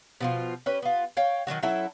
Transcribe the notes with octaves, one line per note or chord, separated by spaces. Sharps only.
B2 F3 F4
C#4 G4 B4
B3 F4
C#5 F5 G5
D#3 E3 F#3 F#4
F#3 C#4 E4 A4